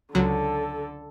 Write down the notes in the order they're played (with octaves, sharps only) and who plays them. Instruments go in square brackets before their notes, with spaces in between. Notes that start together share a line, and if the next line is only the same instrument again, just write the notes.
[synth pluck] C#2 F#3 [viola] D3 A4